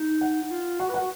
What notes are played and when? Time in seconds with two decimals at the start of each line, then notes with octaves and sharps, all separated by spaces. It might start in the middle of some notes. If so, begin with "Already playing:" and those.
Already playing: D#4
0.21 F#5
0.42 D#4
0.51 F4
0.80 F#4 F#5
0.90 B4
0.94 F#5
0.99 F#4